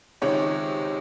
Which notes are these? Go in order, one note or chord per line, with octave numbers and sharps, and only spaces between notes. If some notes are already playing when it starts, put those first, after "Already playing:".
C#2 C3 D#3 G#3 C#5